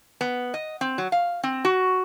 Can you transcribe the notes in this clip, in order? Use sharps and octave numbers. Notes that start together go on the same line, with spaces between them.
B3
D#5
C4
F#3
F5
C4
F#4